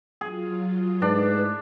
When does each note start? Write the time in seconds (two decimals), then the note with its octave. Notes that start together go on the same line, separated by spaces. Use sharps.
0.21 F#3 F4 G#4
1.02 G#2 A3 D4 E4 B4 D5 E5